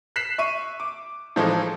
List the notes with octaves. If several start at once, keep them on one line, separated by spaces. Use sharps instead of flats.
F#6 B6 C7 E7
E5 C#6 D#7
D6
A2 E3 F3 G#3 D#4 A4